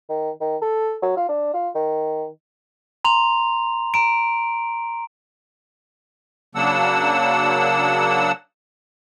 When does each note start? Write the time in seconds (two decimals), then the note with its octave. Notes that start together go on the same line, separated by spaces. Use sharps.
0.09 D#3
0.41 D#3
0.62 A4
1.02 F#3
1.17 F4
1.29 D4
1.54 F4
1.75 D#3
3.05 A#5 C6 F7
3.94 A#5 D7
6.55 C#3 F#3 A#3 D4 F#5 E6